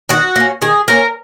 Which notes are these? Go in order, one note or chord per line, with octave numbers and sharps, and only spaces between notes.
D#3 F#4
A#3 C#4
D#3 G#4
A#3 C#4 A#4